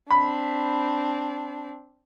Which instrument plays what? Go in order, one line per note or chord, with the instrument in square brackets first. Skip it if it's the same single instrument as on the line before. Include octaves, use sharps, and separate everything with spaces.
[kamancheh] C4 D4 [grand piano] B5